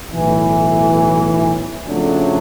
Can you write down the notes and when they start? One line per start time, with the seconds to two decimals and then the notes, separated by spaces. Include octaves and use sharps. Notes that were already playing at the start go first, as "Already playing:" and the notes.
0.10 B1 A2 E3
1.87 F2 C#3 F#3 A3 D4